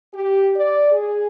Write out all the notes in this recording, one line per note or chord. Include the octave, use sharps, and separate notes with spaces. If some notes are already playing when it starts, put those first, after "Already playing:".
G4
D5
G#4